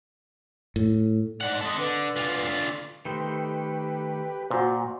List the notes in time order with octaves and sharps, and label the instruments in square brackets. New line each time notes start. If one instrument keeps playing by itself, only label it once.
[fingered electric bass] A2
[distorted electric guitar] G#2 F#5 [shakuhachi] D5
[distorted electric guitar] A4 D#5 [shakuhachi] C6
[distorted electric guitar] D3 [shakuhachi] B4
[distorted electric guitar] D3 F4
[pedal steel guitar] D#3 A3 C5 [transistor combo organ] G4 B4
[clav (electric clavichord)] A#2 [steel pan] F#4 C5